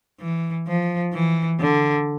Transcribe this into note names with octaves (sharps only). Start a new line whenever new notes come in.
E3
F3
E3
D3